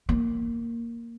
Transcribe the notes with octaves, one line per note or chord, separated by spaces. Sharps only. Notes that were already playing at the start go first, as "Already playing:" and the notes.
A#3